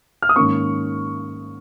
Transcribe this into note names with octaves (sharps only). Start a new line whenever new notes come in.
F6
D#6
G#2 D#3 A#3 C#4 C#6